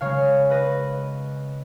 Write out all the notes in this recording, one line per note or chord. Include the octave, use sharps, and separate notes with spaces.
C#3 G#3 C#5 F5
B4 D#5